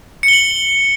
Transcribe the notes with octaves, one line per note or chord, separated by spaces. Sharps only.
C#7
G7
F#7